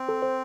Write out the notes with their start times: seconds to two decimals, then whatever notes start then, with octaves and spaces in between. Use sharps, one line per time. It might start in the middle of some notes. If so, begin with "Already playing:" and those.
Already playing: C4
0.09 A4
0.22 C5